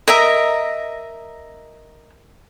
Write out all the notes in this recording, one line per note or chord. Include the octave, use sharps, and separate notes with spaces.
A#4 D#5 E5 A#5